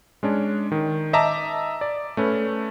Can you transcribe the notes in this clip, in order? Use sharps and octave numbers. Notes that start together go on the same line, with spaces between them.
G#3 C#4 D4
D#3
D#5 E5 A5 A#5 D6
D5
A3 C#4 B4